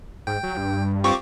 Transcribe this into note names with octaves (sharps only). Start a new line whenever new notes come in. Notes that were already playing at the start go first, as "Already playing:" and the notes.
G#2 G5
F#3
G2
C4 F4 G4 C#6 D6